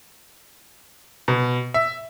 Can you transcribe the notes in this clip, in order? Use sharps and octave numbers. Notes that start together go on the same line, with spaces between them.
B2
E5